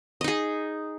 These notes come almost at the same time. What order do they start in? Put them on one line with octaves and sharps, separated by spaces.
D#5 D#4 G#4